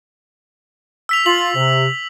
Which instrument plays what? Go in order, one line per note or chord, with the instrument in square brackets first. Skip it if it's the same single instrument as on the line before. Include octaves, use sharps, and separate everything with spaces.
[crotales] E6 B6 F7
[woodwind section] F4 [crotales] F#7
[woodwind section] C3